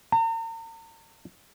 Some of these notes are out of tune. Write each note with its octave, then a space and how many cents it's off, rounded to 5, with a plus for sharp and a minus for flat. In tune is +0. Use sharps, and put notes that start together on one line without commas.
A#5 -45